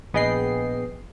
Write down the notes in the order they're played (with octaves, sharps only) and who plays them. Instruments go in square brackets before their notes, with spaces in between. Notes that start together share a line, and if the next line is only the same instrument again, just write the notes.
[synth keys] A#1 B3 G#4 D#5 G5 C7